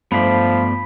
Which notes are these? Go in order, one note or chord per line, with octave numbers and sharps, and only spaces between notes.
G2 F3 A3 B3 C5 D5 B5 B6